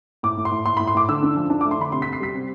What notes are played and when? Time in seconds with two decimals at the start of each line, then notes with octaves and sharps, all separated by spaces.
0.23 A2 D6
0.37 A2
0.45 C6
0.52 A2
0.66 A2 C6
0.77 A2 B5
0.87 C6
0.95 A2 D6
1.09 D3 E6
1.23 D4
1.36 F3
1.50 D4
1.61 A3 D6
1.71 C6
1.78 D3 B5
1.92 C3 C6
2.02 B6
2.07 C3
2.13 C7
2.20 G3 B6
2.35 C4